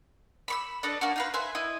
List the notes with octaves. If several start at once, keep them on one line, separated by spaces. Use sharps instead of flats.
B5 C#6 E6
D4 A4 B4 D#5
A#3 D4 F#4
D#4 F4 B4
B4 C5 E5 G#5
E4 D#5 D#6